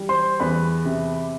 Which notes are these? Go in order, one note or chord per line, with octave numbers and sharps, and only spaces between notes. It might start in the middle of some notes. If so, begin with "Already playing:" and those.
Already playing: G3
C5 C6
E2 B4 B5
C3